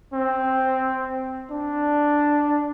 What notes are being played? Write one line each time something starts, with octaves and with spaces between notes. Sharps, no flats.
C4
D4